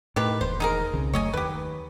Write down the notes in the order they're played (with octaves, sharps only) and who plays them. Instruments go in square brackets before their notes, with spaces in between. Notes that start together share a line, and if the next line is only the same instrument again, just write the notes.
[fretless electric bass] A2 [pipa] D#3 G4 B4
[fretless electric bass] E1 D#2 [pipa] C5
[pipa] D#4 G#4 A#4
[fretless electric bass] C2 C#3
[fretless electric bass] F#1 F#3 A3 [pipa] C#5 D#5 G#5
[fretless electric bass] D#2 [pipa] G4 B4